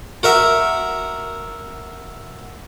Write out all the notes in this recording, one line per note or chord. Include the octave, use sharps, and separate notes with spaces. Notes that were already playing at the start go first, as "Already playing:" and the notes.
F#4 A#4 E5